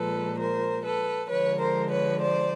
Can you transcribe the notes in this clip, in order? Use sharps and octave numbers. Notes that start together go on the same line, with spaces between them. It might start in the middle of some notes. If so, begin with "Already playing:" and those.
Already playing: A#2 F3 G#3 A4 B4
A#4 C5
A4 B4
D3 F3 G#3 B4 C#5
A#4 C5
B4 C#5
C5 D5